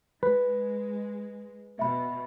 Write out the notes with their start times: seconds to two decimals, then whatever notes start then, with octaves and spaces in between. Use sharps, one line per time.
0.23 G#3 B4
1.79 B2 E5 B5